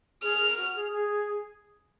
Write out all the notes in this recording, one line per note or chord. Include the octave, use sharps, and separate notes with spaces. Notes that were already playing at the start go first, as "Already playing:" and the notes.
G#4 F6
A#4
F#4
G#4
G#4